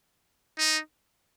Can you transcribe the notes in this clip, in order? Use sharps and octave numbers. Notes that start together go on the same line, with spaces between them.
D#4